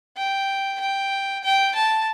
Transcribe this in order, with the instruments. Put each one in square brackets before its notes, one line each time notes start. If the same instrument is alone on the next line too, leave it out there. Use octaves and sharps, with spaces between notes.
[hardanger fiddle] G5
G5
G5
A5